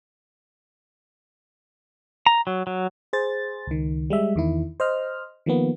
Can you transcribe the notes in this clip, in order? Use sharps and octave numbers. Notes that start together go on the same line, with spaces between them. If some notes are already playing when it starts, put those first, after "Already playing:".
A#5
F#3
F#3
G#4 C5 A6
C#2 D#3
G3 G#3 E5
E2 D#3 E4
C5 D#5 F6
D#3 F3 A#3 B3